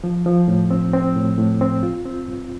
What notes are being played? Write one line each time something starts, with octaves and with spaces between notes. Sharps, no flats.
F3
F3
A2
C4
C4
A2
A2
C4
F4
C4
G2